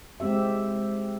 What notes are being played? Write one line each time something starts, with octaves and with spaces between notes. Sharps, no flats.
G#3 C4 G4 E5